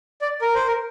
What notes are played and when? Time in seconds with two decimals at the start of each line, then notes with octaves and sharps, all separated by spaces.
0.21 D5
0.42 A#4
0.55 C5
0.68 A#4